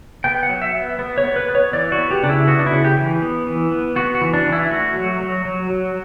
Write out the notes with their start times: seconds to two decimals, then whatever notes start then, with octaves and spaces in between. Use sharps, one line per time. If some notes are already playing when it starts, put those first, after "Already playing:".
0.24 B3 G5
0.43 F#5
0.49 F#3
0.62 E5
0.74 B3
0.99 B3
1.18 C#5
1.24 B3
1.36 B4
1.48 B3
1.55 C#5
1.73 E3 D5
1.92 F#4
1.98 B3
2.11 G4
2.23 C#3 D4
2.29 E4
2.47 B3 F#4
2.59 D4
2.66 E4
2.72 C#3
2.85 G4
2.97 E3
3.22 B3
3.47 E3
3.71 B3
3.96 B3 F#4
4.15 F#4
4.21 E3
4.34 D4
4.47 E3
4.52 E4
4.71 A3 F#4
4.96 F#3
5.20 F#3
5.45 F#3
5.70 F#3